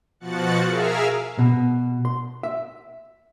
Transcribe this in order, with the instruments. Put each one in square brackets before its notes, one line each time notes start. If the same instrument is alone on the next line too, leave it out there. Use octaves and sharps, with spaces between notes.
[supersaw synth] B2 F3 F#4 F#6 A6 C#7
G#4 A#4 E5 F5 E6 F6
[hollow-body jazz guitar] B2
C6
E5